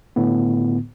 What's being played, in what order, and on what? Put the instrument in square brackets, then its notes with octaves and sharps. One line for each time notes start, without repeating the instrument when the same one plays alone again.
[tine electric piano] A2 D3 B3